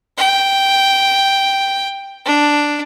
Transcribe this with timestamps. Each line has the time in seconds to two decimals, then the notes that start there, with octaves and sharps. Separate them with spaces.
0.17 G5
2.25 D4